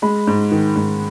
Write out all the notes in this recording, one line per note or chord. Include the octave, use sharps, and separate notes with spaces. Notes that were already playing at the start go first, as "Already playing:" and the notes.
G#3 B5
G#2
D#3
G#2